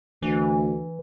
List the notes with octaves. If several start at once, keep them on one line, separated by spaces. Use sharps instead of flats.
D2 E3